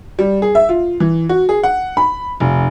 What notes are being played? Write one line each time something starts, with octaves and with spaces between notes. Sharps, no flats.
G3
G#4
E5
F4
E3
F#4
G#4
F#5
B5
F1